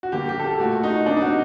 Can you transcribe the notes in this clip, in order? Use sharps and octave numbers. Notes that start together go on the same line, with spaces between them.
F#4
D3 G3 A#3 G4
G4
A4
G4
A#2 A3 F#4
D#4
C3 F#3 A#3 D4
D#4
F#4